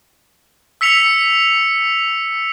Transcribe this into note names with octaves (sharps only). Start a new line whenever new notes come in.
E6 B6 C#7 F7